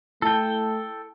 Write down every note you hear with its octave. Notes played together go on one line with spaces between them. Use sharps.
A3 E4 A4 G5 A5